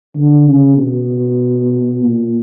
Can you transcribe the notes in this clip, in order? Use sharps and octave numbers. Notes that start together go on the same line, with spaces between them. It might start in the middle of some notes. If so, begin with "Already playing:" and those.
D3
C#3
B2
A#2